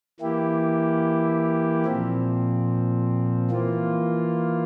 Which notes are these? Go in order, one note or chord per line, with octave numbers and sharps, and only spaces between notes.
E3 A#3 E4 G4
A#2 F3 C4
E3 A#3 F4